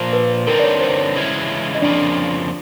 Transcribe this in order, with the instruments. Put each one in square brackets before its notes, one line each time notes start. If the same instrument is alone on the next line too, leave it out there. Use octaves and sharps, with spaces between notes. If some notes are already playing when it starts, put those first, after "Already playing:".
Already playing: [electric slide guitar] A#2 F3 A#3 [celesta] C5
[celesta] B4
[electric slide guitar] D3 G3 C4 D#4 [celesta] A#4
[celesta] D5
C#5
C5
C#5
[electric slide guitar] C#3 E3 G#3 C#4 E4
[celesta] D#5
[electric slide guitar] F2 C#3 F3 A#3 [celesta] D4 D5